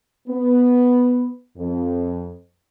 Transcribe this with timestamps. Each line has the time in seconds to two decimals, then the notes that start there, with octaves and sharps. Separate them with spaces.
0.28 B3
1.56 F2